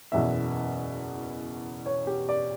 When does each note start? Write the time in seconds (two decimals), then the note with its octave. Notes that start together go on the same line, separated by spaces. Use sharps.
0.12 F#1 E2 B2 E5
1.86 C#5
2.07 G4
2.29 D5